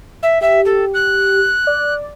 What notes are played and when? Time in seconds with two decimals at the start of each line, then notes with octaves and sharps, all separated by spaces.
0.22 E5
0.41 G4 E5
0.65 A4
0.94 F#6
1.67 D5